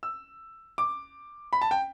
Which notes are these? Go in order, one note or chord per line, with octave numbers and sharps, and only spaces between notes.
E6
D6
B5
A5
G5